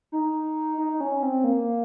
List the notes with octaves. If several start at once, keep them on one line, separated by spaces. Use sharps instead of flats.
D#4
D#4
D#4
C#4
C4
A#3